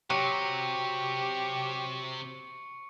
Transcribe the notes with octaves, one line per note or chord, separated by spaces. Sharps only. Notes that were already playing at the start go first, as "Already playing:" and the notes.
C3 F#3 G4 C#6 C#7